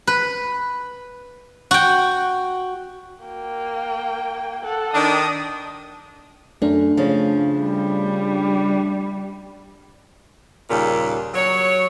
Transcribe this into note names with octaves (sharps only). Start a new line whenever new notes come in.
B4
F#4 G5
A#3 G5
A4 F#5
D#3 D4 D#6
F#2 A3 D4
C#3 F3
G3
D#2 A#2 C#3 G3
F#3 C#5